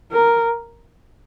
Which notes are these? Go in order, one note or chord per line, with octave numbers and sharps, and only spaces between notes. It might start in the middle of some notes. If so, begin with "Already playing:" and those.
A#4